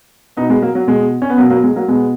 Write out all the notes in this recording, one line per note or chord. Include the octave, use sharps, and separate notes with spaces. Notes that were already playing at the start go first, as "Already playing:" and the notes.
B2 B3 D#4
G#3 B3
F#3 A#3
F#3
B2 G#3
C#4
B3
B2 F#3 A#3
F#3 A#3
G#3
F#3 A#3
B2 G#3 B3